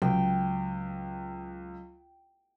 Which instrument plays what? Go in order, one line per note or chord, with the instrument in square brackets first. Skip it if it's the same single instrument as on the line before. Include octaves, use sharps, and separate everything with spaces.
[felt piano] C#2 [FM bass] F#3 [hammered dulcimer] G5